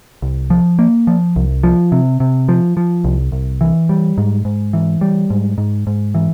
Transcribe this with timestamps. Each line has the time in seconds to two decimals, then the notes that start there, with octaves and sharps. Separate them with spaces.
0.22 C2
0.50 F3
0.79 A#3
1.07 F3
1.36 C2
1.63 F3
1.92 C3
2.20 C3
2.49 F3
2.77 F3
3.04 C2
3.32 C2
3.61 E3
3.89 G3
4.18 G#2
4.45 G#2
4.73 E3
5.01 G3
5.30 G#2
5.58 G#2
5.87 G#2
6.14 E3